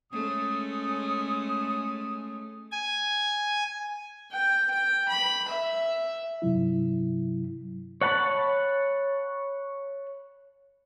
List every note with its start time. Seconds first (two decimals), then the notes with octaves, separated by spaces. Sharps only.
0.12 G#3 A3 C#4 D#6
2.72 G#5
4.31 G5
4.71 G5
5.09 B5
5.48 E5
6.42 G2 C3 F#3 E4
8.01 C#5 F#5 A5 B5